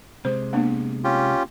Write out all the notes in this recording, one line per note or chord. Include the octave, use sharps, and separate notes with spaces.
C3 G#3 C5
A#3 B3 D4
C#4 F4 G4